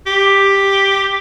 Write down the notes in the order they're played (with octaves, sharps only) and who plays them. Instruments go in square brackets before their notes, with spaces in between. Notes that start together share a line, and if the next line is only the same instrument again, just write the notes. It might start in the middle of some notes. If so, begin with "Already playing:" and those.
[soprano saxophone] G4